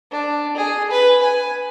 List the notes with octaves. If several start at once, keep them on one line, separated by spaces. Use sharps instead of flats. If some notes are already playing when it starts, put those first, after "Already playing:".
D4
G#4
B4
G#5